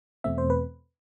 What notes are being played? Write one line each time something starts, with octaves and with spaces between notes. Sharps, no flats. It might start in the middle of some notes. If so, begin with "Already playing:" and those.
E2 B2 A3 C4 E5
C5
B4